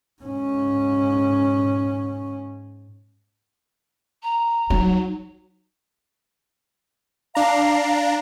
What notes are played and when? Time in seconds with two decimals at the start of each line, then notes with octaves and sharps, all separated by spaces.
0.22 G#2 C#4
4.22 A#5
4.70 F#3 D#4
7.35 D4 F5 A#5